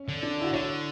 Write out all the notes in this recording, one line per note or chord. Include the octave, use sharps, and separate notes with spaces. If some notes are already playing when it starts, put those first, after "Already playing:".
Already playing: C#4
D3
D4
E4
F#4
D3 C#5